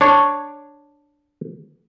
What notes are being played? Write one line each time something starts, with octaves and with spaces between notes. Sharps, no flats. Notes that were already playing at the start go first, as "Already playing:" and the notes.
D4 C#5